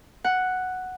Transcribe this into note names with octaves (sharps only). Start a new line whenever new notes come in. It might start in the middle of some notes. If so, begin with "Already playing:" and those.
F#5